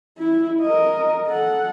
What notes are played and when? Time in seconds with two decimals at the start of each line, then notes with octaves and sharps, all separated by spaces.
0.18 E4
0.63 A#4 D#5
1.27 A4 F#5